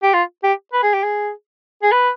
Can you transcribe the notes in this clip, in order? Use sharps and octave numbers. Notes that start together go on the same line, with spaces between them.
G4
F4
G4
B4
G#4
G4
G#4
G#4
B4